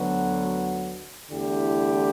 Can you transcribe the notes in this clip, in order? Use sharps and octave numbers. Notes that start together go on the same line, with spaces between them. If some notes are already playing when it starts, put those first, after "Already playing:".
Already playing: D2 D3 F#3 B3 F#4
E2 D3 A3 E4 G4